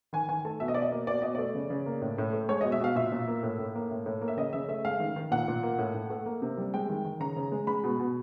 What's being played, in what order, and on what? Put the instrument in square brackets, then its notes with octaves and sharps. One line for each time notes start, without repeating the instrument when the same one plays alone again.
[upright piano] D#3 G#5
D#3 G#5
A3 A5
B2 E5
D#5
B2 D5
D#5
A#3
B2 D5
B2 D#5
A3 D5
C#3
C#3
A#3
A2
A2
A3
G#3 C#5
D#5
B2
E5
B2 F5
A#2 E5
A#2
A#3
A2
A2
A#3
A2
A2
A#3
E5
C#3 D#5
C#3 E5
A3 E5
G#3 F5
D#3
D#3
A#2 F#5
A#2
A#3
A2
A2
A3
A#3
C3
G3
G#3 G5
D#3
D#3
C#3 A#5
C#3
G#3
G#3 B5
B2
B2